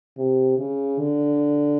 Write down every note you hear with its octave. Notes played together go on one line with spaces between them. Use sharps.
C3
C#3
D3